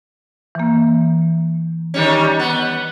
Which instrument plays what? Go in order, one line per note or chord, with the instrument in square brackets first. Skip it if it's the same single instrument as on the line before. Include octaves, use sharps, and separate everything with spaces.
[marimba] E3 A#3
[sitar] D#3 G3 C#4
B3